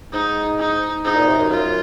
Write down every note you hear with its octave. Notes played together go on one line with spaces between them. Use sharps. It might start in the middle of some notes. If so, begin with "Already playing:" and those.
G#2 D#4
D#4
G#2 D#4
A#2
C3
F#2
F#2 F4